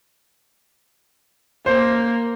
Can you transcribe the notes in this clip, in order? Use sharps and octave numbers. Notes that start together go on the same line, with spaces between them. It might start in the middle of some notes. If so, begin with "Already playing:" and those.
A#3 C5